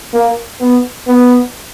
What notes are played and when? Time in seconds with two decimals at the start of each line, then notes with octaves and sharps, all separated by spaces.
0.14 A#3
0.61 B3
1.08 B3